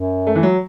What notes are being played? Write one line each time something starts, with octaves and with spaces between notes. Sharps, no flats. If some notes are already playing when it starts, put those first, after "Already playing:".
Already playing: F#2
A3
E3
F#3